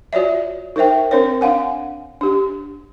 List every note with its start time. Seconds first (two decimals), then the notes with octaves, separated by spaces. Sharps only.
0.13 F4 F#4 C#5 D5 E5
0.76 D#4 A#4 C5 E5 G5
1.11 C4 D4 A#4 C5 C#5
1.41 D4 F5 F#5 G#5
2.21 D4 G4